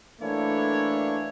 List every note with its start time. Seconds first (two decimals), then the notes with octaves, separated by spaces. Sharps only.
0.21 E3 A3 A#3 D4 E4 C#5